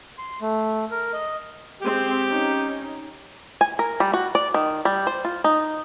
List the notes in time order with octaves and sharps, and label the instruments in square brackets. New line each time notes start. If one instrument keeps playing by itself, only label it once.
[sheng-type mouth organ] C6
A3
A#4
D#5
[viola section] G#3 C4 [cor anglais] G4
[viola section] C#4 D#4
[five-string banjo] G#5
A#4
G3
F#4
D5
D#3
G3
C5
F4
D#4